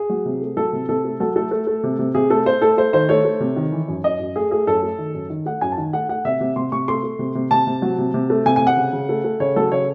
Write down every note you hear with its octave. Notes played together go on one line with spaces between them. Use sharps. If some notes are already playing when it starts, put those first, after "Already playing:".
Already playing: G#4
F#3
C3
A3
F#3 A4
C3
C3 A4
A3
F#3 A4
A3 A4
A3
A3
C3
C3
C3 G#4
A3 A4
A3 C5
A3 A4
A3 C5
D#3 C5
A3 C#5
A3
C3
D#3
E3
F#2
F#2 D#5
F#2
A3 G#4
A3 G#4
F#2 A4
A3
D#3
F#2
D#3
A3 F#5
F#2 G#5
A5
D#3
A3 F#5
A3 F#5
C3 E5
C3
C3 C6
C3 C#6
A3 C6
A3
C3
C3
C3 A5
C3
F#3
C3
C3
A3
C3 G#5
G#5
C3
F#5
C#3
C#3
A3
A3
C#3 C#5
F#3 A4
C#3 C#5